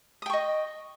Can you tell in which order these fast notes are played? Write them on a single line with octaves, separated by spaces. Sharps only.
D#6 G5 C#6 D#5